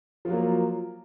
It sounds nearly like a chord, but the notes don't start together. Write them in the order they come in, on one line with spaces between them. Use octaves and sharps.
F3 F4 F#3 A#3